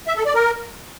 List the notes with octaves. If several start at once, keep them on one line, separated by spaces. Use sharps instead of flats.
E5
A4
D5
A#4